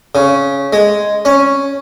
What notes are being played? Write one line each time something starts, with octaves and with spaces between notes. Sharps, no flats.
C#3
G#3
C#4